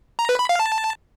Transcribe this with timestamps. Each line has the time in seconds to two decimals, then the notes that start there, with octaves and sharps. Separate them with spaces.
0.19 A#5
0.29 B4
0.39 B5
0.49 F5
0.60 A5